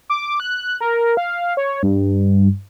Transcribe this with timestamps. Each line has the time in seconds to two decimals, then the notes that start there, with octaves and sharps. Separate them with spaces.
0.10 D6
0.40 F#6
0.81 A#4
1.17 F5
1.57 C#5
1.83 G2